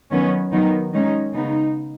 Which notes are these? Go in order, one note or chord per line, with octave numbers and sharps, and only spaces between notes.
D#3 F#3 B3 C#4
D#3 F#3 B3 D#4
D#3 G#3 C#4 D#4
C#3 G#3 B3 D#4